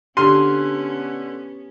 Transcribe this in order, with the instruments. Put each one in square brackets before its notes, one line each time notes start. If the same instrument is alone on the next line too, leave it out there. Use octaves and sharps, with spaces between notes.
[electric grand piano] D3 F6 D#7 [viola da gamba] B3 C#4 [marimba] G4 [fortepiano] C6